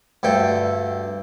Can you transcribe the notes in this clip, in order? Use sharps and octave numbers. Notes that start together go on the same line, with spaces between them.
D2 G2 A4 G5